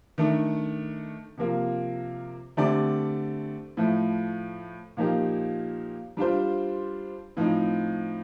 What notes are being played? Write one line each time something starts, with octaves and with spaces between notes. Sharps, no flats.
D#3 A3 D4
C3 F3 A#3 F4
D3 A3 C4 G4 D5
A2 F3 A3
A#2 F3 A#3 D#4 G4
G3 D4 F4 C5
A2 F3 C4 D#4